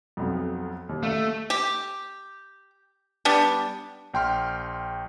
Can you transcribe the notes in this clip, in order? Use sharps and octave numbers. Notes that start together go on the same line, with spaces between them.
B1 F2
D#2
A3 E5 F5
G4
G3 B3 D4
A#1 G5 C6 F6